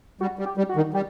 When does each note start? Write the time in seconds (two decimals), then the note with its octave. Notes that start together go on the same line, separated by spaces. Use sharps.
0.21 G3 F#4
0.39 G3
0.46 G4
0.57 G3
0.69 F#4
0.76 D#3
0.94 G3 G4